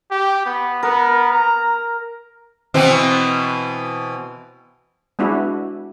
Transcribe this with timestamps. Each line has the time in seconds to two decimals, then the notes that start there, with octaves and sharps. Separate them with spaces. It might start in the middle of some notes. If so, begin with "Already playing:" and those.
0.11 G4
0.46 B3
0.83 B3 A#4
1.31 A#5
2.74 B2 E3 C4
5.19 G#3 B3 D4 E4 F#4